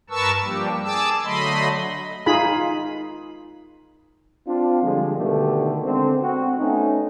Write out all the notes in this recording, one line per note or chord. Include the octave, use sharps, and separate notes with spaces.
G2 A#4 B4 A5 C#6 E6
F3 G3 A#3 D4 G4
G#4 A5 D6 E6
D3 F#3 A3 D#5 B5 C6
D#4 F4 G#4 B5
C4 D4 F4
D3 F3 G3 G#3
B2 D3 D#3 A3 G4
D3 G#3 C4
C4 F#4
A3 B3 C#4 D#4